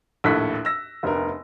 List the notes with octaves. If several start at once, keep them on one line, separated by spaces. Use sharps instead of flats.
A#1 D#2 A2 A4 F#6 B6
E6 A#6
F1 D2 B3 A#4